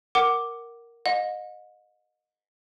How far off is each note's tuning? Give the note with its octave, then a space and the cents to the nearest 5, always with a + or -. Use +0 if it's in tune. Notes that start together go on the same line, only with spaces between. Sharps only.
A#4 +0 F#5 +15 D6 +0
D#5 -10 F#5 -45